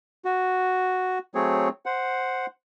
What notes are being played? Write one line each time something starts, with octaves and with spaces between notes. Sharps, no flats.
F#4
F#3 A3 C4 G#4 C#5
C5 F#5